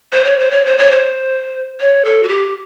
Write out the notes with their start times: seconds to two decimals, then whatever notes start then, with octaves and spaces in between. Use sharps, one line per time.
0.13 C5
0.25 C#5
0.39 C5
0.51 C#5
0.65 C5
0.78 C#5
0.91 C5
1.80 C#5
2.05 A4
2.23 F#4
2.28 G4